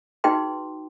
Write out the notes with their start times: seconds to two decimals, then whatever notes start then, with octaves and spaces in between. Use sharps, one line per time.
0.24 D#4 F#4 G#4 B4 G5 C6